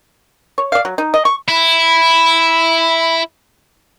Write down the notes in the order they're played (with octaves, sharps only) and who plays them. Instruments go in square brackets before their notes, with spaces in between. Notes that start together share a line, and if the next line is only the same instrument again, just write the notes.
[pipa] C#5
D5 F5
F#3
D#4
D#5
C#6
[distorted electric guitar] E4 [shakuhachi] B5